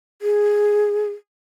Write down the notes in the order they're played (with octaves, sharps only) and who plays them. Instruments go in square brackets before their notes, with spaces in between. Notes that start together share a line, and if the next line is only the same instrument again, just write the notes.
[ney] G#4